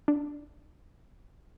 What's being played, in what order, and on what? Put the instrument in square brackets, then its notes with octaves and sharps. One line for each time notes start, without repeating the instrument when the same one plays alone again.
[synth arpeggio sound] D4